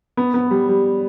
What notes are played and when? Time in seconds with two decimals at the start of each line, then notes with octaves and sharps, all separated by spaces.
0.17 B3
0.34 B3
0.51 G3
0.69 G3